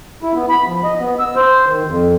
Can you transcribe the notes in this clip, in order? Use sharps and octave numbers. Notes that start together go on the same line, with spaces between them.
E4
B3
B5
F3
D#5
B3
E6
C5
D#3
F2